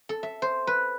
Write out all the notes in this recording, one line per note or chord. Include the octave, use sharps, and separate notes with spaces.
A4
E5
C5
B4